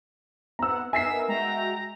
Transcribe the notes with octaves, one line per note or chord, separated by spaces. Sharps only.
B3 C4 F#5 A#5 E6
B3 D#4 A#4 E5 G#5 E6 B6 C7
G#3 F#4 E5 G5 A#5